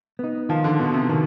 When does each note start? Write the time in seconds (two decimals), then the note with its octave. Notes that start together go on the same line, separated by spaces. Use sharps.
0.19 B3 D#4
0.49 D#3 F3
0.64 D3
0.79 B2 B3 D#4
0.94 C3
1.09 B2 D#3